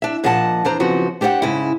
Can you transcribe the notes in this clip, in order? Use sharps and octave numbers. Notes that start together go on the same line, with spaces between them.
D4 E5
A#2 F3 D#5 F#5 A5
E2 D4 C5 A#5
F#2 C#3 F3 B3 C4 F#4
D4 G4 C5 C#5 F#5
G#2 C#3 E4